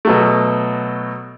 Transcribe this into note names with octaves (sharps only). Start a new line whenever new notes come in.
B2 F#3 A3